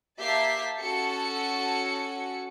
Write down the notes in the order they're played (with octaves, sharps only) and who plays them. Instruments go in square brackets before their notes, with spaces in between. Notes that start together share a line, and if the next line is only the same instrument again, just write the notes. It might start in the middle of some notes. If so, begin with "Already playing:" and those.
[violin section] A#3 G4 E5 A5 B6 C7
C#4 F#4 A4 C#7